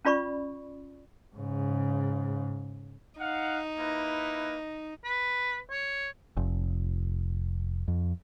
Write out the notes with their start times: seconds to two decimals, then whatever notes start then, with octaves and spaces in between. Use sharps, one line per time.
0.05 C#4 F4 D5 B5 C#6
1.35 G#2 C#3
3.20 D#4 F5 F#5
3.79 A#3 E4 B4
5.04 B4
5.70 C#5
6.37 F1
7.88 F2